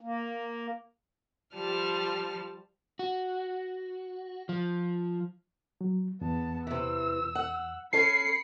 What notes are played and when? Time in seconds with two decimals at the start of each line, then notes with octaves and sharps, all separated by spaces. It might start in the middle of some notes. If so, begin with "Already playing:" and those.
0.01 A#3
1.55 F3 G3 A5 F6
2.99 F#4
4.49 F3
5.81 F#3
6.21 E2 B3 A5
6.67 C3 E3 E6
7.35 F#5
7.93 C#4 A4 C#5 B5 C7 C#7